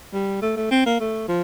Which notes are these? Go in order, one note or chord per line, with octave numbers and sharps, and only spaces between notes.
G3
A3
A3
C4
A#3
A3
F3